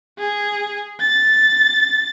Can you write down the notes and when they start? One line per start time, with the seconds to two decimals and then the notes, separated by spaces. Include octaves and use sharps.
0.19 G#4
1.00 A6